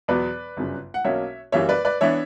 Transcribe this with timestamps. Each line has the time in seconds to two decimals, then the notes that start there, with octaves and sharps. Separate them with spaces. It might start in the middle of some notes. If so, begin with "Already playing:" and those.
0.08 E2 B2 F#3 B3 B4 D5
0.57 G1 F#2 C#3
0.94 F#5
1.05 B1 B2 A#3 C#4 C#5 E5
1.52 F#2 E3 G3 A#3 C#5 E5
1.69 B4 D5
1.85 B4 D5
2.01 E3 B3 D4 C#5 E5